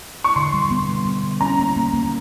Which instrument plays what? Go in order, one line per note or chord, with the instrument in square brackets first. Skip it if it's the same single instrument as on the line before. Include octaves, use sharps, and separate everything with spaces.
[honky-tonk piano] C#6
[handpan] D3 [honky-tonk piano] C6
[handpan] G3
B3
G3
G3
D3
[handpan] C#4 [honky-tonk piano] A#5
[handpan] A#3
A#3
A#3